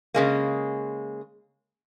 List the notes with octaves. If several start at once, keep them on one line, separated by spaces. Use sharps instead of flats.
C#3 G#3 A#3